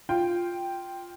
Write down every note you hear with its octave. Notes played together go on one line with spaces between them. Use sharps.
F4 G5